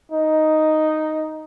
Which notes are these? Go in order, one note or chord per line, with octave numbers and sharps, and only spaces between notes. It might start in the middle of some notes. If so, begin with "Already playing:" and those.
D#4